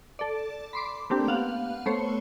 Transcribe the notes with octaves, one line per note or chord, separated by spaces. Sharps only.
A4 D5
B5 C6 D6
A3 A#3 C4 D4 G4
B3 F5 F#5
A3 B3 C5 C#5